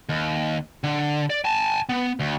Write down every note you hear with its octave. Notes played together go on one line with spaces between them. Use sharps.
D#2
D3
D5
G#5 A5
B3
D2